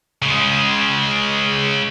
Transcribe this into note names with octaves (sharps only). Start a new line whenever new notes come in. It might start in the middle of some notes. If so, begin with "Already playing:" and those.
C#3 G#3